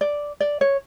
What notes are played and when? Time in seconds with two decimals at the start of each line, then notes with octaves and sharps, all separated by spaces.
0.01 D5
0.40 D5
0.61 C#5